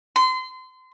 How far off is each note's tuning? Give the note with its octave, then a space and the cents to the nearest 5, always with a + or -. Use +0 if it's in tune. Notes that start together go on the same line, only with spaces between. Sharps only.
C6 -30